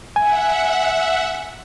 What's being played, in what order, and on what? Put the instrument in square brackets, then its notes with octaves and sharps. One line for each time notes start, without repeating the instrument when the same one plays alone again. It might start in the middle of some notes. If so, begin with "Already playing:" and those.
[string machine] E5 F#5 [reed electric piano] G#5